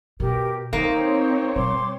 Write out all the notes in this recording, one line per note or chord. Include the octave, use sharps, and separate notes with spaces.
B2 G4 A#4
D#3 A#3 C4 D#4 C#5
B2 G3 C6 D6